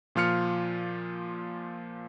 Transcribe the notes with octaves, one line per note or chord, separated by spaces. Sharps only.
A#2 F3 F4 F6 C#7